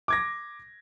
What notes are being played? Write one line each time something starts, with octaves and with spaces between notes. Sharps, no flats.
D6 G#6 A#6